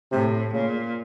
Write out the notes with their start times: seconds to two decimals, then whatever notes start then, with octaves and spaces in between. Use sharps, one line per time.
0.12 A2 C3
0.53 A#2 C#3